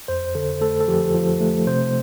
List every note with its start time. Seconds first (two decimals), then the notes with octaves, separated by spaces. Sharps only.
0.08 F2 C5
0.35 D3 A4
0.61 A3 A4
0.80 A4
0.88 F3 G4
1.14 F3
1.41 A3
1.67 C3 C5